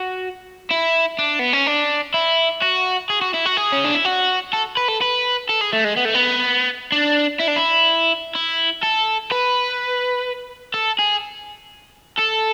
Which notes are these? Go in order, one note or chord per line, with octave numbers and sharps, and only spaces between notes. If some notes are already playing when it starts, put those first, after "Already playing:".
Already playing: F#4
E4
D4
B3
C#4
D4
E4
F#4
G#4
F#4
E4
F#4
G#4
C#4
D4
E4
F#4
A4
B4
A4
B4
A4
G#4
A3
G#3
B3
A3
B3
D4
E4
D4
E4
E4
A4
B4
A4
G#4
A4